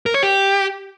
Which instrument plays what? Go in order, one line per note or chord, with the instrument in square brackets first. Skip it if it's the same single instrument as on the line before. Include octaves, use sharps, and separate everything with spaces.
[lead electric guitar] A#4
C#5
G4